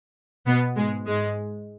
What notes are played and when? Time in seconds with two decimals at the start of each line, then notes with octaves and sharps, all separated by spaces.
0.46 B2 B3
0.76 G#2 G#3
1.06 G#2 G#3